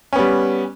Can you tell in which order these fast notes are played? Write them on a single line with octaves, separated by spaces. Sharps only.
C#4 B3 G3